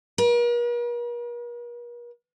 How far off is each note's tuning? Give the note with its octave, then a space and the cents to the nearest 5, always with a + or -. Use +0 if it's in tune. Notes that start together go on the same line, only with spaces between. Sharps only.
A#4 +45